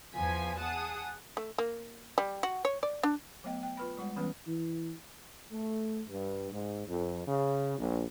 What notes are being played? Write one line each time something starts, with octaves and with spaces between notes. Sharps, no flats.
E2 F3 B3 G#5 B6
G#4 F#5 A5 D#6
A3
A#3
G3
F#4
C#5
D5
D4
F#3 A3 B3 D#5 G5
G5
F4 B4 B5
G3 G#3 F#5
E3 G3 B3 C#4 B4
E3
A3
G2
G#2
F2
C#3
A#1